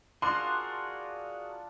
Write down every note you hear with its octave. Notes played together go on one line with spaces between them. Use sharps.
D4 F4 F#4 G#4 A#4 C6